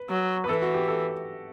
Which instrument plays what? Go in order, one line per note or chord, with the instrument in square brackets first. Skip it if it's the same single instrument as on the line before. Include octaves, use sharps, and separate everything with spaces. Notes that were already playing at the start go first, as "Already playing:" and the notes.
Already playing: [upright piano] B4
[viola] F#3
[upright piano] B4
[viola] E3 [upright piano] A4
[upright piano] F#4
G4
A4